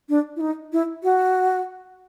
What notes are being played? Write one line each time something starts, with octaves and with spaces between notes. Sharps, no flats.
D4
E4
D#4
E4
F#4